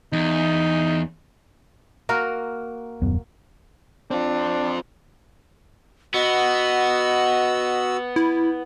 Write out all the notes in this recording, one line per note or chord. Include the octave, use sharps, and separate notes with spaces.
E2 D#4
A#3 F#4 A#4
D#1 F#2 B3
C4 D4 F4
B3 F#4 D#5 E6
E4